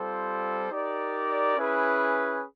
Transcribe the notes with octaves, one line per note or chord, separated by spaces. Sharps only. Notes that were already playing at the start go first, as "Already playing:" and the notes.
Already playing: G3 C4 F4 A4 C5
D#4 G4 A#4 D5
C#4 E4 G#4 B4